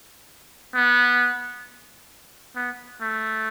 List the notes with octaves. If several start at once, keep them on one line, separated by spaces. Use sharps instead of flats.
B3
B3
A3